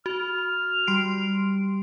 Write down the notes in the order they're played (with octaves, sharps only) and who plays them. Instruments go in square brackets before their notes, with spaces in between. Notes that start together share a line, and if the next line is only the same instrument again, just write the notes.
[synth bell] F#4 [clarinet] F6
[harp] G3 [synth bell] C6 C7 D7